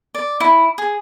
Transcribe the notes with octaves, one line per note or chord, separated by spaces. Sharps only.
D5
E4
G#4